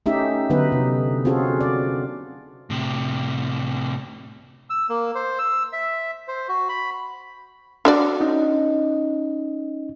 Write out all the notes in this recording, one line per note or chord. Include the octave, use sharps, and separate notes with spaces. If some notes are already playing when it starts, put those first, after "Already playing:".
A3 C#4 D#4 G4 E5
D3 F#3 B3 D#4 B4
C3
C4 C#4 F4 F#4 G#4 A4
D5
A2 C3
E6
A#3
C5
E6
E5
C5
F#4
B5
D4 F#4 D5
C#4 D#4 D#5